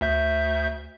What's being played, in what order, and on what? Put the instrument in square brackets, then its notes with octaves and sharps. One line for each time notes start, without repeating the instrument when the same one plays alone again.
[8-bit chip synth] D2 E5 G6